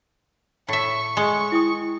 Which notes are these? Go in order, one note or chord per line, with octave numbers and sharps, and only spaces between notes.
A2 E5 C#6
G#3
E4 G5 D#6